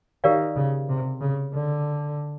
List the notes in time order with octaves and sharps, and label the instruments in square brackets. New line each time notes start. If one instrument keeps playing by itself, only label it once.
[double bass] D#3 [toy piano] G4 A#4 D5 F5
[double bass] C#3
C3
C#3
D3